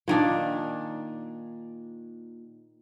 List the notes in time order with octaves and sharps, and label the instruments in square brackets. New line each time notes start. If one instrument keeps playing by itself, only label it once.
[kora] A#2 D#3 D4